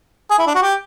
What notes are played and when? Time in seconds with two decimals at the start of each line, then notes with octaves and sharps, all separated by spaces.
0.30 G#4
0.39 E4
0.47 D4
0.55 F#4
0.63 G4